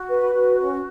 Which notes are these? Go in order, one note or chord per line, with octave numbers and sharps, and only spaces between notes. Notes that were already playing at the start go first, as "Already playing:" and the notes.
Already playing: F#4
B4
F#4
C#4